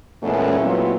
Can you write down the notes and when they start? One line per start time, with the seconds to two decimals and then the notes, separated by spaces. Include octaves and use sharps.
0.23 E2 A#2 G#3 A3 B3 C#4
0.60 A#2 F#3 B3 C4 E4 F4